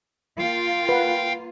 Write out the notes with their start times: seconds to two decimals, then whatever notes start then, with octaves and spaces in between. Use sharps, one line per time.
0.38 A#3 F4 F5 G5
0.89 B4 F#5